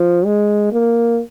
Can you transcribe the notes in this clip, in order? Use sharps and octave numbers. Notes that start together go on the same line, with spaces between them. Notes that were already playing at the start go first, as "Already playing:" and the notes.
Already playing: F3
G#3
A#3